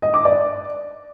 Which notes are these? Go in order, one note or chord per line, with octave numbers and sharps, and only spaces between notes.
D#5
D6
D5